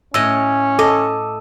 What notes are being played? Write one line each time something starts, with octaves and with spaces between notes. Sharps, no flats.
A2 C#4 D#5 E6
A4 D#5 D6